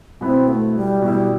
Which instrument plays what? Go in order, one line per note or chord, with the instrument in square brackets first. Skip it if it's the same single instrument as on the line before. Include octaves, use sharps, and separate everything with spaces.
[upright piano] B2 B3 E4 [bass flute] C4
[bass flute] A3
G3
[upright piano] B2 B3 E4 [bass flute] G3